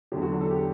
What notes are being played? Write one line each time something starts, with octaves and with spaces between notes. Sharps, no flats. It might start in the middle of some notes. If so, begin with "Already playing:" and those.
E2 D3 F#3 G4
F#4
D4
A4
G4